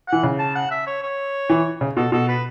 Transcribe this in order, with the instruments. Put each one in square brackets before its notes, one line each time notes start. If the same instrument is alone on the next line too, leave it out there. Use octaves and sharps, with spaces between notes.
[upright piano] E3 [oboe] F#5
[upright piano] C#3
[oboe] A5
F#5
E5
C#5
C#5
[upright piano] E3
C#3
[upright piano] B2 [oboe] A4
[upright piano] B2 [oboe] A4
[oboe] B4